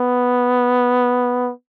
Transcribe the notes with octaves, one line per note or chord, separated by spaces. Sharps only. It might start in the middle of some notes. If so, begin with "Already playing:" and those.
Already playing: B3